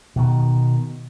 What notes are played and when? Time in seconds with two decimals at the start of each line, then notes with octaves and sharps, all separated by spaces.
0.16 B2 D#3